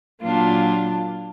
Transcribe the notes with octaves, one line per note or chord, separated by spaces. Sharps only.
A#2 F#3 A#3 D4 F4